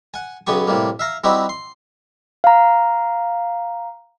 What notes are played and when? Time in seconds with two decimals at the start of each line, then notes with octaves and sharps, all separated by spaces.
0.14 F#5 G#5
0.47 B1 C#3 B3 G4 G#5 C#6
0.68 A2 C3 G3 A#3
0.99 E5 F5 A#5
1.24 G3 C4 D#4 E4 F#4 G4
1.49 C6
2.44 F5 A#5